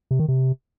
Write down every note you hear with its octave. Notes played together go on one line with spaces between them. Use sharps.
C3
D#3
C3